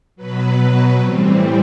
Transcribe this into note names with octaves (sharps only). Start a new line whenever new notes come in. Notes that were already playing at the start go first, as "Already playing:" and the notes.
B2 F#3 B4
B4
A2 E3 G3 C4